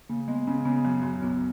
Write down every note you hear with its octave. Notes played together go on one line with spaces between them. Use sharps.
C#3 A#3
G#3 B3
C#3 C#4
C#3 B3
F#2
F#2
B1 B3